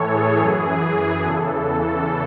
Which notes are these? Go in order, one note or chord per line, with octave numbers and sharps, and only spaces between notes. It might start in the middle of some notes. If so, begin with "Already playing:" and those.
Already playing: A2 E3 A4 C#5
G#4
F#2 E3
E2 C#3 E3 A4